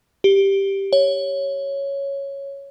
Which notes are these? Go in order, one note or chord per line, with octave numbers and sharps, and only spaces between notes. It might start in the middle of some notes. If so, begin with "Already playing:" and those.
G4
C#5